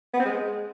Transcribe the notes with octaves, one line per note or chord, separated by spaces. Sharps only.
B3
C4
G#3